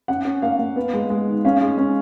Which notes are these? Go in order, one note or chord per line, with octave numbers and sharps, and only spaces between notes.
C#4 F#5
C#4
A#3 F5
A#3
B3
G#3
G#3
D#3
C#4 F5
G#3
C#4